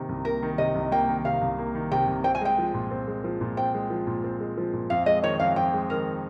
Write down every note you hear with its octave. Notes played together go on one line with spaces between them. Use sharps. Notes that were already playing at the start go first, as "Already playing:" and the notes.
Already playing: C3 D#3 A#3
C2
A#3 A#4
D#3
C3 D#5
C2
A#3 G5
D#3
C3 F5
C2
A#3
D#3
C3 G5
C2
C4 G5
G#5
G#3 G5
F3
A#2
C4
G#3
F3
A#2
C4 G5
G#3
F3
A#2
C4
G#3
F3
A#2
F2 F5
G#3 D#5
D#3 C#5
F2 F5
F2 G5
G#3
D#3 A#4